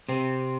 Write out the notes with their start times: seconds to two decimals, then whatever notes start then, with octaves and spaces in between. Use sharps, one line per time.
0.09 C3 C4